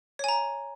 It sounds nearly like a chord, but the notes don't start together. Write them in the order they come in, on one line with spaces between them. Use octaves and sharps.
C#5 G#5 A#5